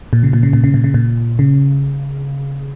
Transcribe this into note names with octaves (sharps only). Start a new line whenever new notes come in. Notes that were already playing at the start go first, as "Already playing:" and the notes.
A#2
C#3
A#2
C#3
A#2
C#3
A#2
C#3
A#2
C#3